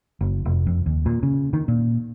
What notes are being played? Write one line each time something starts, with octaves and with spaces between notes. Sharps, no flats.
F#1
F1
F2
D#2
A#2
C#3
D#3
A#2